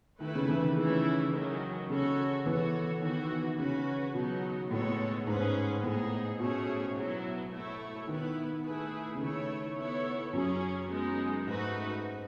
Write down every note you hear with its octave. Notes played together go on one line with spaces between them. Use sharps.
D#3 A3 E4 B4
C#3
E3
D#3
C#3 E3 A3 C#4 E4
D#3 F#3 C#4
C#3 C#4 F#4 A4 C#5
E3 B3 F#4 A4 C#5
D#3 E3 B3 F#4
C#3 C#4 F#4 B4
B2 F#3 B3 D#4
A2 G#3 B3 D#4 A4 C#5
G#2 C#4 G#4 B4
A2 B3 D#4 G#4
B2 A3 C#4 G#4 C#5
F#3 B3 E4
A3 E4 A4 C#5
D#3 B3 E4 B4
A3 E4 G#4 B4
C#3
D#3 A3 E4 A4 C#5
B3 E4 A4 C#5
F#2 C#4 G#4 C#5
G#3 B3 D#4
G#2 A3 D#4 F#4 B4